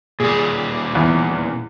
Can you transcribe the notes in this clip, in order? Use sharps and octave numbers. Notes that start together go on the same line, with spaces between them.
A#2 G3 G#4
E2